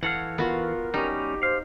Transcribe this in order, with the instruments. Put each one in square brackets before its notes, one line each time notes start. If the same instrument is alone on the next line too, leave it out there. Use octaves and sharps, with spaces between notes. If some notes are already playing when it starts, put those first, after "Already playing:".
[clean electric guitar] E3 A4 F5 [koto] C#5 F#5
[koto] B3 F#4 [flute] F4 [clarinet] A#4
[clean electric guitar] G3 C#4 [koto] D#4 [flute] G4
[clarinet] C5 [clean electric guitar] F5